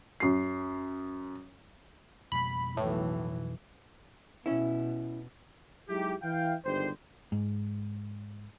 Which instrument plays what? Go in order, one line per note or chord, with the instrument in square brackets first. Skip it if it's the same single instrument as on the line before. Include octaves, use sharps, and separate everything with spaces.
[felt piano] F#2 C7
[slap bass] F2 B2 G3 [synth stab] B5
[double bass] B1 E3 [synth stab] A2
[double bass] B2 [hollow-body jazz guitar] C#4 E4
[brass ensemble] F#3 G#3 D#4 E4 G4
E3 E4 F5 G5
G1 G#2 D#3 D4 G4 C5
[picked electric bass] G#2